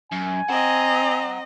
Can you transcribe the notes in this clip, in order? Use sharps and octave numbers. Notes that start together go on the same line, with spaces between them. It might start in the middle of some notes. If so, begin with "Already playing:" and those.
F#2 G#5
C4 D#5 F#5 A#5